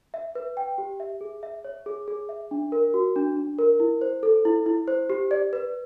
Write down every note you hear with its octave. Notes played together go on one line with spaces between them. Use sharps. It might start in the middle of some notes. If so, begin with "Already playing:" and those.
E5
B4
G5
G4
E5
G#4
E5
C#5
G#4
G#4
E5
D4
A#4
F#4
D4
D4
A#4
E4
C5
A4
E4
E4
C5
G4
D5
B4